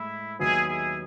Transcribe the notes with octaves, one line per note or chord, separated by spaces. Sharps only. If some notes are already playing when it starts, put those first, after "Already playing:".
Already playing: A2 G#3 E4
D#2 D#3 F#3 B3 E4 G#4
E4 G#4